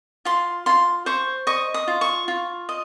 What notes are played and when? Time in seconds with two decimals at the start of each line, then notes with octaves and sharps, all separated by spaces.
0.25 F4 C6
0.66 F4 C6
1.06 C5 C#6
1.47 D#5 C#6
1.74 D#6
1.88 F4
2.01 C#6
2.28 F4
2.69 D#5